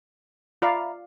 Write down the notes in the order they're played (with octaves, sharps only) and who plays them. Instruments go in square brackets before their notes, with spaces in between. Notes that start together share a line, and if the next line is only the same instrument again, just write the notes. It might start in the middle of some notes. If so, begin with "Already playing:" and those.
[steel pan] F4 D5 F5 [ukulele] E5 A#5 B5